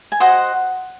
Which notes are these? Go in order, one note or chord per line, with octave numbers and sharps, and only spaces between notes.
G#5
F#4 C5 D#5 F#5